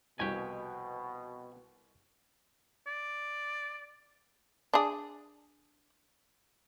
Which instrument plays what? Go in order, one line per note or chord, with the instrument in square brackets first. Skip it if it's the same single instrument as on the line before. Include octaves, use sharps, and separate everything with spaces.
[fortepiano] C2 [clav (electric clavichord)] F2 G4 [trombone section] B2 [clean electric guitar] F#4 G#5
[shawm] D5
[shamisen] D4 G#4